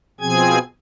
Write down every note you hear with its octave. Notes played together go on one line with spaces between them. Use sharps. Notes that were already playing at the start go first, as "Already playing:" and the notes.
B2 F3 C4 G#4 G#5 G#6